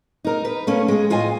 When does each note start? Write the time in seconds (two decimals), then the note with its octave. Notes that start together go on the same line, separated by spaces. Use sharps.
0.24 D#4 A#4
0.45 B4
0.67 A3 A#3 C#4
0.88 G#3 G#4
1.10 A2 F4 D#5 G#5